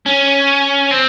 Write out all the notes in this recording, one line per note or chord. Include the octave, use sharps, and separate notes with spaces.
C#4
C4